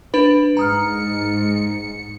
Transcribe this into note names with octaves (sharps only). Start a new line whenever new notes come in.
D4 B4 B5
G#2 A#5 D#6 F6 C#7